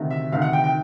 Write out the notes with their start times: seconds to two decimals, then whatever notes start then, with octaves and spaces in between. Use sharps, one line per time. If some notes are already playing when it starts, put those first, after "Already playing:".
Already playing: D2 C3 D#3
0.11 E5
0.32 D2 C3 D#3 F5
0.42 F#5
0.53 G5
0.64 G5